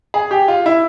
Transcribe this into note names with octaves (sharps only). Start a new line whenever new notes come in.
G#4
G4
F4
E4